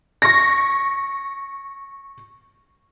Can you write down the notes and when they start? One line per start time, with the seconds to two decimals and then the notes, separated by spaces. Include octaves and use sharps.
0.22 C#6 A#6